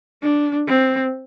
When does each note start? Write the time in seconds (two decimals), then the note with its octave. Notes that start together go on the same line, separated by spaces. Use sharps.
0.23 D4
0.67 C4